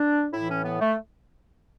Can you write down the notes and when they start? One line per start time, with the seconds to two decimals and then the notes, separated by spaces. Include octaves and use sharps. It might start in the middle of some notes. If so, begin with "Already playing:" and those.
Already playing: D4
0.33 A2 E3 E4
0.49 C#4
0.64 B3
0.81 A3